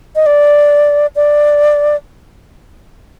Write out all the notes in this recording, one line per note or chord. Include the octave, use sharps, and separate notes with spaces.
D#5
D5
D5